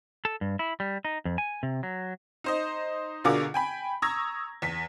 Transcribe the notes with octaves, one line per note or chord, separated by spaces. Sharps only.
A4
G2
E4
G3
D#4
F2
G#5
C3
F#3
D#4 C5 D#5
B2 D3 F4 G#4 A#4 D6
G5 G#5 B5
A#5 C#6 D#6 E6 G#6 A#6
E2 B6